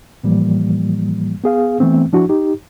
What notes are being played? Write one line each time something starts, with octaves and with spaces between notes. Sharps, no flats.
A2 E3 F3 G3 A#3
B3 G#4 F5
E3 A3 B3 C4
F3 D4 E4 F#4
D#4 G4